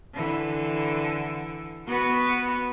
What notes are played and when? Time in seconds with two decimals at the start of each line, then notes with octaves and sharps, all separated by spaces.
0.14 D3 E3
1.87 B3 F#4 B4